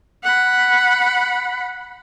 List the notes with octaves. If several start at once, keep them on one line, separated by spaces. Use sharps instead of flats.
F#5 B5